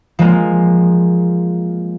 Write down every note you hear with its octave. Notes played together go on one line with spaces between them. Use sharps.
F3 G#3 A#3